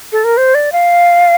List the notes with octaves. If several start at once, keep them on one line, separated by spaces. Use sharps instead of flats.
A4
A#4
C5
D5
F5